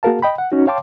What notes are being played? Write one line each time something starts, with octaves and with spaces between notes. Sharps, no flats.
A#3 F#4 G#4 A#4 F5 A5
D#5 G5 B5
F#5
C#4 D#4 F#4
C#5 F5 G5 A5 C6 D6